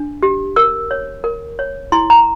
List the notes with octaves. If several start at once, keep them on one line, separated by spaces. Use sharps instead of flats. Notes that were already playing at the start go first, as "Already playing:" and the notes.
Already playing: D4
G4
A#4 E6
C#5
A#4
C#5
E4 C6
A#5